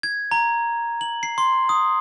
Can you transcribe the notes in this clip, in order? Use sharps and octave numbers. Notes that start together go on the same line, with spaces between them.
G#6
A#5
F#7
C7
C6
D#6